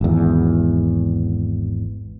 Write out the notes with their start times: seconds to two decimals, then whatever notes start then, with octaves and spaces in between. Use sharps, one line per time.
0.01 G#1 E2